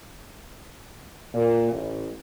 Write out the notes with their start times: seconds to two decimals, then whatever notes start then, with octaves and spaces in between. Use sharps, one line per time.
1.34 A#2
1.72 A1